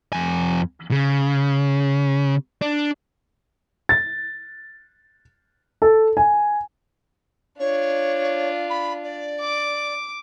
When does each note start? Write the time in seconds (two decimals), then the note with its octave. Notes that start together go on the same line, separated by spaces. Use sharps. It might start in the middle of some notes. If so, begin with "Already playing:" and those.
0.13 F2 G#5
0.91 C#3
2.61 D4
3.89 A6
5.82 A4
6.17 G#5
7.59 D4 F4 C#5
8.70 B5
9.03 D5
9.40 D6